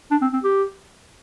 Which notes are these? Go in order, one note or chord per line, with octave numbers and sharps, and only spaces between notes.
D4
C4
C4
G4